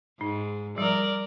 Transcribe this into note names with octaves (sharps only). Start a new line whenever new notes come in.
G#2 D#4
F3 G3 A#4 D5